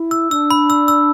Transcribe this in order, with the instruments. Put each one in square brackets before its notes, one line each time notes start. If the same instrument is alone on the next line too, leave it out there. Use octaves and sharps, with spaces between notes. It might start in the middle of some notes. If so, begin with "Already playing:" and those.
Already playing: [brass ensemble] E4
[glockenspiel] E6
[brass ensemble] D4 [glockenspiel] E6
[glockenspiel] B5
E6
E6